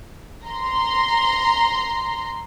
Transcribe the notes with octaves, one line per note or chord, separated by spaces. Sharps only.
A#5 C6